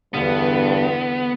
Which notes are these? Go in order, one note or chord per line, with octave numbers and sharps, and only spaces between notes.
E2 G2 D3 B3